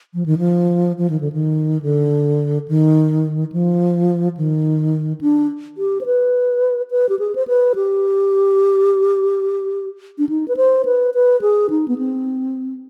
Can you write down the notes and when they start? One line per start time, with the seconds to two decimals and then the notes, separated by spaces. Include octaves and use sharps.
0.14 F3
0.26 D#3
0.38 F3
0.98 F3
1.10 D#3
1.20 D3
1.32 D#3
1.82 D3
2.68 D#3
3.52 F3
4.37 D#3
5.21 D4
5.78 G4
6.01 C5
6.06 B4
6.91 B4
7.09 G4
7.19 G#4
7.35 C5
7.48 B4
7.75 G4
10.18 D4
10.29 D#4
10.48 B4
10.57 C5
10.85 B4
11.14 B4
11.42 G#4
11.70 D#4
11.88 B3
11.98 C4